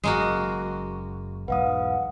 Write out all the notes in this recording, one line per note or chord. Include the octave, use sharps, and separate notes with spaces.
F#1 F#2 G#3 A#3 F#4
B1 E2 G#2 B4 F5 F#5 D#6